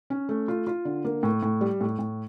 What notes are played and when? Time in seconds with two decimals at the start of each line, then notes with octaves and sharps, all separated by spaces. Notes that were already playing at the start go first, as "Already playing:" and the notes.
0.10 C#4
0.29 A3
0.48 F4
0.67 F4
0.85 D3
1.05 A#3
1.23 A2
1.43 A2
1.61 G3
1.81 A2
1.99 A2